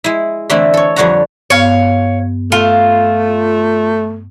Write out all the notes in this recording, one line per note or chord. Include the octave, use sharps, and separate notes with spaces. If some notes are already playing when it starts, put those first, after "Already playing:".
G#3 E4
D3 E3 A3 C4 D4 E4
A4 C#5
F2 D3 G3 C#5 F#5 A#5
G2 B3 C#5 F5
A3 F4